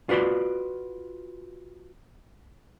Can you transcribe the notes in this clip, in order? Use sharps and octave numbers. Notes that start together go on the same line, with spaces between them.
F4 F#4 B4 D5 C6